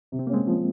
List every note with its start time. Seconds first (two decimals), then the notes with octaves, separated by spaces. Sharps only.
0.12 C3
0.19 C4
0.27 A#3
0.30 G#3 C4 C#4
0.47 F3